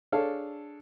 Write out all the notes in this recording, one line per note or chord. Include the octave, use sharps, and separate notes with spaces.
D4 G#4 A4 C#5 F5